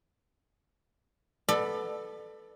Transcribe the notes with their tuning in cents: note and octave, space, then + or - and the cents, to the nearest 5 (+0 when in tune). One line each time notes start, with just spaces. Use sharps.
B3 +0 A4 -5 D5 +30